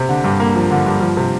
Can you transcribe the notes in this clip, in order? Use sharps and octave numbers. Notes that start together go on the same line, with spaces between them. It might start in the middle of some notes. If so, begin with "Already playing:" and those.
Already playing: C3
D3
G2
A#3
F3
D3
G2
F3
C3